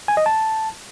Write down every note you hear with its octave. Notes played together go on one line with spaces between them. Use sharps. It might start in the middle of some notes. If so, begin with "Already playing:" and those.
G#5
D#5
A5